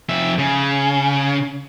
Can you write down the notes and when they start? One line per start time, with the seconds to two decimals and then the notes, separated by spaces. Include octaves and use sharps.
0.09 F2 E5
0.39 C#3